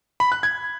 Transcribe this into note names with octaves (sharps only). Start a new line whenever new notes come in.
B5
F#6
G#6